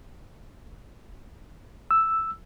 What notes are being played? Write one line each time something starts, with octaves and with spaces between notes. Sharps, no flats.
E6